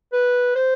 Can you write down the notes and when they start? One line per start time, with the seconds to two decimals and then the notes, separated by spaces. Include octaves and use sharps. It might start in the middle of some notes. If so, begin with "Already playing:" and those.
0.13 B4
0.56 C5